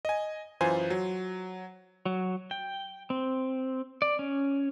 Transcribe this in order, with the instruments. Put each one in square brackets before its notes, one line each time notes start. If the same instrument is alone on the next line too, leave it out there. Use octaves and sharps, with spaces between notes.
[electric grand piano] D#5 G#5
F#2 E3 F4 C5 G#5
F#3
[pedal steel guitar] F#3
G5
C4
D5
C#4